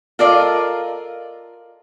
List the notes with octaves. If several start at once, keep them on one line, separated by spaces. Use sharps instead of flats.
F4 A4 A#4 D5 D#5 F5